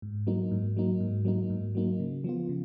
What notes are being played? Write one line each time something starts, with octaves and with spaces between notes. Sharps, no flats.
G#2
F#3 A#3 D#4
G#2
F#3 A#3 D#4
G#2
F#3 A#3 D#4
G#2
F#3 A#3 D#4
C#3
F3 B3 F4
C#3